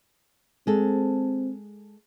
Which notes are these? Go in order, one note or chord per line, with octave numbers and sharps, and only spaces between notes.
G#3 C4 A4